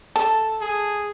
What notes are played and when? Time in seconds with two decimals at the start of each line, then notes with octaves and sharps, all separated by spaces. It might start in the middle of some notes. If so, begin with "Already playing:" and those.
0.16 A4 A5
0.61 G#4